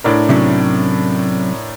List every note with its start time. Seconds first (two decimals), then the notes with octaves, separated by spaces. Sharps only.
0.04 A2 D4 A#4
0.29 C3 F#3 C#4